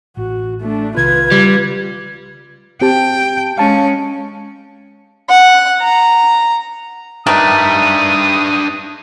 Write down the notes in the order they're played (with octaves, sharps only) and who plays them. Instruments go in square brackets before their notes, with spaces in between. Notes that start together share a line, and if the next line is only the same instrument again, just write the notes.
[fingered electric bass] A1 [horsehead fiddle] F#4
[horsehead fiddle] A3 D4
[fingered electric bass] B1 C3 D#3 [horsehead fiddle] F4 B4 [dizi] G#6
[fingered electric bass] C#3 [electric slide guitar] G3
[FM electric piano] C4 G4 A5 [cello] G5
[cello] G#3 C#4 [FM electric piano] F5 A5
[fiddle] F#5
A#5
[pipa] D#3 A3 [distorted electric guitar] D4 B4 [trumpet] D#6